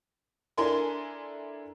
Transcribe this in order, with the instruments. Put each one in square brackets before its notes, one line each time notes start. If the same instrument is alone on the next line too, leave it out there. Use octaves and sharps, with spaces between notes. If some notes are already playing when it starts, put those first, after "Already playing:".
[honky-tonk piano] D4 E4 A4 A#4 G#5 C6